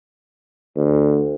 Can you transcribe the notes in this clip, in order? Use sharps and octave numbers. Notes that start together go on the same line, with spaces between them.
D2